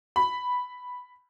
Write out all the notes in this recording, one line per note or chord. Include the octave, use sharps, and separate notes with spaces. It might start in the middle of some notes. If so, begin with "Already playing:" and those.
B5